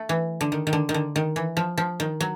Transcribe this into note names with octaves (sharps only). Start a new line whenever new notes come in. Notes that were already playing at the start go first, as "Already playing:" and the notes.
Already playing: A3
E3
D3
D#3
D#3
D3
D#3
D3
D#3
E3
F3
F3
D#3
F#3